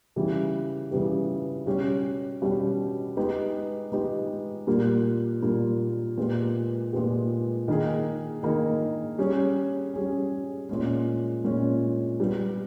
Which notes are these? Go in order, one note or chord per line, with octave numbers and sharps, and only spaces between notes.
C#3 E3 G3 B3 G4
C#3 E3 G3 B3 G4
B2 G3 C#4 G4
B2 G3 C#4 G4
G#3 B3 D#4 G4
G#3 B3 D#4 G4
A#2 G3 A#3
A#2 G3 A#3
A#2 G#3 B3 G4
A#2 G#3 B3 G4
D#3 A#3 D#4 G#4
D#3 A#3 D#4 G#4
G3 C#4 G#4
G3 C#4 G#4
A#2 G#3 C#4
A#2 G#3 C#4
G3 B3 G4